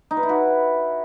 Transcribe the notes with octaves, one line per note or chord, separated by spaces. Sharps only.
D#4
B4
E4
F#4